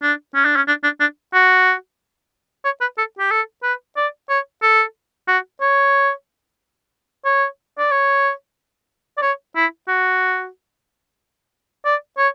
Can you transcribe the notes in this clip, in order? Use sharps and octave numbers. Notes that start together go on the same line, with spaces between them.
D4
C#4
D4
C#4
D4
D4
D4
F#4
C#5
B4
A4
G4
A4
B4
D5
C#5
A4
F#4
C#5
C#5
D5
C#5
D5
C#5
E4
F#4
D5
C#5